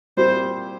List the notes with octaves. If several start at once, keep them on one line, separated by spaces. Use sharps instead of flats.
A#2 G3 C4 E4 G4 C5